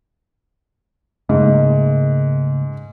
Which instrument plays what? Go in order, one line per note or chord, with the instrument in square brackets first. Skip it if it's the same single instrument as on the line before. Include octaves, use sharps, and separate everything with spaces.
[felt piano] G#2 [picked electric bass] C#3 A3 A#3